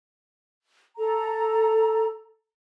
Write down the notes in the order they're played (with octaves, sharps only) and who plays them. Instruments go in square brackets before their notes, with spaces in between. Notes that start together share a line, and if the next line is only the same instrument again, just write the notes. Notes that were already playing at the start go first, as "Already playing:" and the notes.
[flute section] A4 A#5